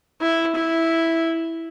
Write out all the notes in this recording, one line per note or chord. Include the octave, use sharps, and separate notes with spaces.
E4
E4